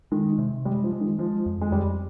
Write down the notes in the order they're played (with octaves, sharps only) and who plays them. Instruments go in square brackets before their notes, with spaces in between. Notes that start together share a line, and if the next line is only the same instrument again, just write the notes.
[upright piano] D#3 [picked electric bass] G#3
[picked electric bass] C3
[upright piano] G3 [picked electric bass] G#3
[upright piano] F3
[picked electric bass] G#3
[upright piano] D#3
[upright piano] F3 [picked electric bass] G#3
[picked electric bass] F2
[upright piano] G#3
[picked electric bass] F2 [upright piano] G3